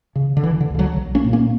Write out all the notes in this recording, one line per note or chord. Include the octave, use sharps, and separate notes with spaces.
C#3
D3
E1 E3
D3
D2 C#3
D3 F#3
B1
A#3 C#4
A#2
A#3 C#4